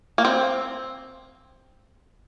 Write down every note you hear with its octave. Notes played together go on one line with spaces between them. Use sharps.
A#3
C4